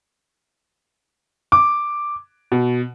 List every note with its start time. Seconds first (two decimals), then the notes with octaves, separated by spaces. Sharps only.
1.52 D6
2.52 B2